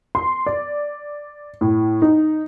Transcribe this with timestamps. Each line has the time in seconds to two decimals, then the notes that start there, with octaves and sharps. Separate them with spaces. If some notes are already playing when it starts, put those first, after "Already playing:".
0.15 C6
0.46 D5
1.61 A2
2.02 D#4